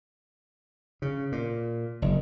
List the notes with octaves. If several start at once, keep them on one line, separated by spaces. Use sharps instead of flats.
C#3
A#2
F#1